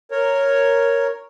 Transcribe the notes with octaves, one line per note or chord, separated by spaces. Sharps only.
A#4 C#5